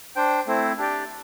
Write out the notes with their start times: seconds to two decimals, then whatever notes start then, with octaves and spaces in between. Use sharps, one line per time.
0.16 D4 C5 G5
0.47 A3 C4 E4 C5
0.78 D4 G4 D5 G5